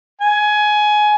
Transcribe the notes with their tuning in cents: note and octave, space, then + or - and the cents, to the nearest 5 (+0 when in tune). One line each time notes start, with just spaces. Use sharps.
G#5 +15